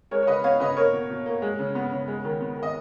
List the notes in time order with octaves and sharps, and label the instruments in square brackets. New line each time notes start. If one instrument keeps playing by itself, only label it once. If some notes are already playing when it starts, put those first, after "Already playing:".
[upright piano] G#3 A#4 C#5
C#5
C#3 B4 D#5
B3 C#5 F5
C#3 B4 D#5
A#3 A#4 C#5
B2
B2
A#3
G#3
C#3
B3
C#3
G#3
D#3
B3
D#3
D#5